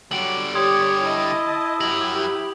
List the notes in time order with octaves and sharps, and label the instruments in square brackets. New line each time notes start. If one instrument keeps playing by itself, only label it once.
[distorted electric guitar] D3 G3 [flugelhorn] F#3 [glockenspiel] D7 F#7
[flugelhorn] G4 [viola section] C#5 [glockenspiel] C6 D#6 G#6
[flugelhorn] E4 [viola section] D#5 A5
[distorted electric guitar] F#3 A#4 [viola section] G4 [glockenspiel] F#7